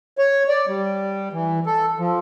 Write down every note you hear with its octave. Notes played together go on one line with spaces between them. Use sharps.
C#5
D5
G3
E3
A4
F3